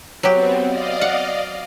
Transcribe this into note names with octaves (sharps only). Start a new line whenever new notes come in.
F#3 B3 C4 G4
D5 D#5 F5
F#5